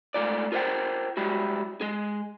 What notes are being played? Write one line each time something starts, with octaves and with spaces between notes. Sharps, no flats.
G#2 A3 F4 D5
F4 A#4 C5 C#5 F#5 G5
G3 G#3 E4 F#4
G#3 G#4